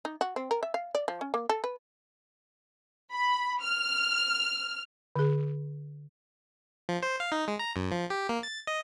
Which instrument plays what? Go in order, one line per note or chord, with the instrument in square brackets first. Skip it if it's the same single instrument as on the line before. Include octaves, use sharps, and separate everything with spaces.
[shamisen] D#4
F#4
C4
A#4
E5
F5
D5
F3
C#4
A#3
A4
B4
[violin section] B5
F6
[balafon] D3 G#4
[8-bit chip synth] F3
C5
F5
D#4
G#3
A#5
F#2
F3
G4
A#3
A6
D#5